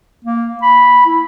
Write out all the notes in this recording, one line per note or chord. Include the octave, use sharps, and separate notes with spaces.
A#3
B5
E4